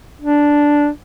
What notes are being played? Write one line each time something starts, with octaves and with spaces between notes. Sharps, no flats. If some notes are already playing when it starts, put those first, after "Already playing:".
D4